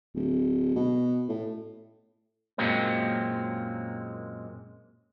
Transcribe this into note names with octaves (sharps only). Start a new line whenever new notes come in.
D1
B2
A2
F#2 A#2 F#3 G#3 A#3 C4